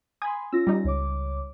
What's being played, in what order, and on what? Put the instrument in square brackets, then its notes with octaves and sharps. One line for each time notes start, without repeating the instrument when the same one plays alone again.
[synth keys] G#5 B5 C6 [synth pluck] D#6 G#6
[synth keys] C#4 F4 A#6 [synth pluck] E6
[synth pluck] G3 D#4
[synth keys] C#2 C#5 D6